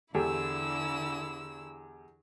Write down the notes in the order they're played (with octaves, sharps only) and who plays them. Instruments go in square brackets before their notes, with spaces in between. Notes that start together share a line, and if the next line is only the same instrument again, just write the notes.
[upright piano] E2 G4 A4 [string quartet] D3 E4 E6